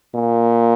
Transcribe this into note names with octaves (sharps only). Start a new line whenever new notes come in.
A#2